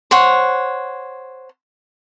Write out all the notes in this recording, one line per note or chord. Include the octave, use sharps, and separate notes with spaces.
C5 C#5 F#5